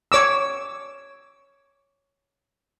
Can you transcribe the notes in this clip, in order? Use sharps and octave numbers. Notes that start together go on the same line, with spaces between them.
C#5 D6 E6